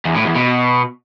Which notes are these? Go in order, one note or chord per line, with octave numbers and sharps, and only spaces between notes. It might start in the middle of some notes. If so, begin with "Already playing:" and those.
E2
A2
E2
B2